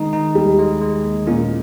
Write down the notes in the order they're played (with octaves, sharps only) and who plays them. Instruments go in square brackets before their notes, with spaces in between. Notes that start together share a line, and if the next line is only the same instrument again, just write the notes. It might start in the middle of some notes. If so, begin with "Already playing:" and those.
Already playing: [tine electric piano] D#3 G#3 D#4
D#4
[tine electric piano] D#2 [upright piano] G3
[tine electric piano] G#3
G#3
D#2
[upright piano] A#2 A#3 [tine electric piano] C#4